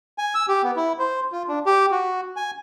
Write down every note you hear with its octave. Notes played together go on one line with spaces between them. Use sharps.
G#5
E6
G4
B3
E4
C5
F4
D4
G4
F#4
G#5